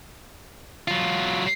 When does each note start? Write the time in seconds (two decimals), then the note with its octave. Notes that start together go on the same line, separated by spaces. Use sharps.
0.88 F#3 F4